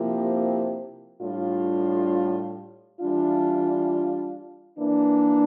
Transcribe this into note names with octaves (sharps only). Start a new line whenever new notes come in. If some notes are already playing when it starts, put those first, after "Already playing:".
Already playing: C3 F3 A#3 E4 G4
A2 G3 D4 F4
E3 G3 D4 F4
E3 A#3 D4